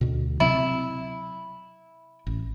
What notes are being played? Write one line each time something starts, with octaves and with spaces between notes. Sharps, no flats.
D2 B2
C3 F#3 C4 E4
A1